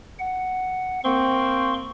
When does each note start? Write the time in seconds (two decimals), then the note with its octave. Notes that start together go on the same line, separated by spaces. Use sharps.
0.19 F#5
1.04 A#3 C4 C6 C#6